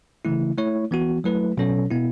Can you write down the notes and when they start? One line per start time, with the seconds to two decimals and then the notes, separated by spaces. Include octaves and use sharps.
0.25 C#3 E3 A3 E4
0.58 A3 E4 C#5
0.91 E3 B3 F#4
1.24 F#3 A3 E4 B4
1.57 B2 F#3 C#4 A4 C#5
1.90 B2 B3 E4